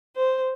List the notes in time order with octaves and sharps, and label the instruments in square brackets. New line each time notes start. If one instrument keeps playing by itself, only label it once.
[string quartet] C5